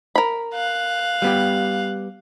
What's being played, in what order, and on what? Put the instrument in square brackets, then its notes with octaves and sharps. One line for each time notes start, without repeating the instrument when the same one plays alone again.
[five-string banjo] A#4 B5
[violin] F5 F#6
[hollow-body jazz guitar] G3 B3 G4